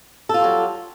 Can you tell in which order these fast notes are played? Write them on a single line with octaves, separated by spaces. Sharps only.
A4 F4 G3 F#3